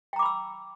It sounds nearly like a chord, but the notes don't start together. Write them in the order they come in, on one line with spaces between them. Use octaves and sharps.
G5 A#5 D6 B5 E6